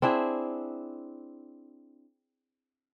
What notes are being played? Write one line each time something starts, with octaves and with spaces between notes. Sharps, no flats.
C4 D4 E4 G#4